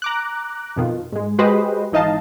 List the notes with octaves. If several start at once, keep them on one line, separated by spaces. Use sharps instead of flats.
A#5 D6 F#6
F2 B2 D#3 F4
G#2 G#3
G#3 F#4 G4 B4 C5 D#5
G#1 E3 D#4 D#5 F5 A5